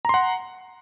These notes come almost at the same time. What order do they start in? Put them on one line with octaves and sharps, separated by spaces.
A#5 C6 F#5